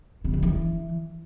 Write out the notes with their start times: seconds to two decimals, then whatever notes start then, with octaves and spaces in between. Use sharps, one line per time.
0.24 C3
0.34 C#3
0.43 E3